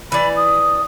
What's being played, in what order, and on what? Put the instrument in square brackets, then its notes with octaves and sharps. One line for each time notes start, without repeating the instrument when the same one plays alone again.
[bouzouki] E3 D5 [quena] B5
[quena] D#6